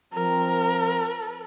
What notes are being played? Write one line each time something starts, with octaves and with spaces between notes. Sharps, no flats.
F3 C4 A#4